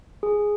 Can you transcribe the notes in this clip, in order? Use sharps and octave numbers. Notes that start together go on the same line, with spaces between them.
G#4